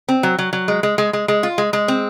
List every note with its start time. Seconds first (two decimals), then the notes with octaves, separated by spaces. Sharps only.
0.09 C4
0.23 F#3
0.39 F#3
0.53 F#3
0.68 G#3
0.83 G#3
0.98 G#3
1.13 G#3
1.28 G#3
1.43 F4
1.58 G#3
1.73 G#3
1.88 C4